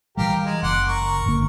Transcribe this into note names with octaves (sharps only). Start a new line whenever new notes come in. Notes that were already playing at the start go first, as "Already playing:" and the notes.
E3 F3 G3 G4 A#4 F5
G#3
F#1 F#5 C6 D6
A#4 C#6
G1 D3 A#3